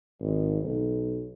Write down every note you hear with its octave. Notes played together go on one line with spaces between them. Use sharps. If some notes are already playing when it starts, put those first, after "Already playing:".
G#1
B1